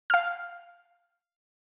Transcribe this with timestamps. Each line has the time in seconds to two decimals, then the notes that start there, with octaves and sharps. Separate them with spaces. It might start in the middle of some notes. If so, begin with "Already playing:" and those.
0.10 F5 F6